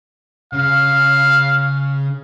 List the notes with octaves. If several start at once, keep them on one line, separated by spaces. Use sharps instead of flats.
C#3 F5